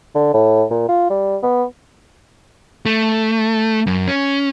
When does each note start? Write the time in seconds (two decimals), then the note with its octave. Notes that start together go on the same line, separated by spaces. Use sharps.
0.15 D3
0.34 A2
0.71 A#2
0.89 F4
1.10 G3
1.43 B3
2.86 A3
3.87 F#2
4.08 C#4